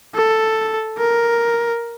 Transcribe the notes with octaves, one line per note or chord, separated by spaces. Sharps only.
A4
A#4